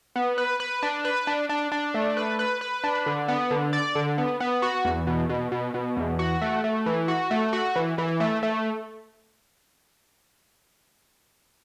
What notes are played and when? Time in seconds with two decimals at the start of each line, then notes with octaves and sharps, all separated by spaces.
0.16 B3
0.38 B4
0.60 B4
0.83 D4
1.05 B4
1.27 D4
1.49 D4
1.72 D4
1.94 A3
2.17 B4
2.39 B4
2.61 B4
2.84 D4
3.06 D3
3.28 B3
3.51 D3
3.73 D5
3.95 D3
4.18 B3
4.40 B3
4.62 F#4
4.85 E2
5.07 B2
5.29 B2
5.52 B2
5.74 B2
5.97 E2
6.19 F#4
6.41 A3
6.64 A3
6.86 E3
7.08 F#4
7.31 A3
7.53 F#4
7.75 E3
7.98 E3
8.20 A3
8.43 A3